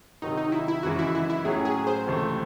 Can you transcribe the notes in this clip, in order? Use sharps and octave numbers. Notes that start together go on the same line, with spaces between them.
C3 D#3 F#3 D#4
D#4
E4
E4
F#2 C#3 E3 G#3 F#4
E4
E4
E4
A2 F#3 C#4 G#4
G#4
C5
C#2 C3 E3 A3